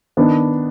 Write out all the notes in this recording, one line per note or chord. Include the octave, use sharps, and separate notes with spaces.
D#3 B3 D4